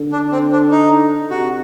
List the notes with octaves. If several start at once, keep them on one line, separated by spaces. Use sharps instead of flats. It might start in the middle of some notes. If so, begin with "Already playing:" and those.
Already playing: D3
D4
C4
D4
D#4
C3 F#4